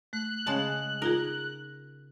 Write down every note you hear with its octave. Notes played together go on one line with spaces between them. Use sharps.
A3 F#6
C#3 G#3 A5
D#4 F4 G#4 A#4